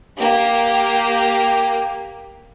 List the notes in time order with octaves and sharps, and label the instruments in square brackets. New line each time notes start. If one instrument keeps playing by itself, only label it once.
[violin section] A#3 G4